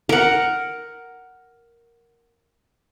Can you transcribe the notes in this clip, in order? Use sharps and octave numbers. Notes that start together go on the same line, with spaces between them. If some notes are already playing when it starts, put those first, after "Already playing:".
A#4 F#5